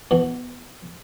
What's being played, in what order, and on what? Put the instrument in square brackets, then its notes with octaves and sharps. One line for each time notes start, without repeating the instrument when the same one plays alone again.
[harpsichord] B2 E3